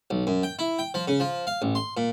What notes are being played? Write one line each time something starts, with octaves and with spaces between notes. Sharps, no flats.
B1
F#2
G5
E4
G5
F3
C#3
F3
F5
A1
C6
A#2